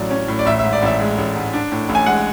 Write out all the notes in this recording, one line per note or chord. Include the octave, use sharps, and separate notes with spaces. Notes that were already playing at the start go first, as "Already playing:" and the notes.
Already playing: A1 A2 F#3 C#4 D5
C#4
A2
D5
A1 E5
E5
G#2
D5
A1 E5
G#3
A1
G#2
D4
A2
A1
G#5
G#3 F#5